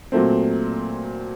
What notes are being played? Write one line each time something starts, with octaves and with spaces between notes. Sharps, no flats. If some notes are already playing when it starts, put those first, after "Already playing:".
A#2 F#3 A3 C4